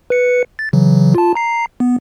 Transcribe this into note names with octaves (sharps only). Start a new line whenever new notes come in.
B4 C#7
A6
C#3 E3 F#3
F4 A5
A#5 C7
B3